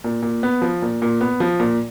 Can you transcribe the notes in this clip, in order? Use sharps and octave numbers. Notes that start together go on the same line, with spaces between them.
A#2
A#2
B3
F3
A#2
A#2
B3
F3
A#2